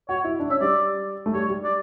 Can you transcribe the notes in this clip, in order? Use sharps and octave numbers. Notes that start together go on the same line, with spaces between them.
F#4 C#5
E4
D4
C#4 E5
G3 D5
A3
G3 C#5
G3
D5